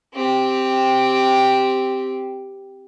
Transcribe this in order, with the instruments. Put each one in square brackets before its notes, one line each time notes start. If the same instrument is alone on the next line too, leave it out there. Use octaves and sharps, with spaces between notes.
[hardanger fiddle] C4 G4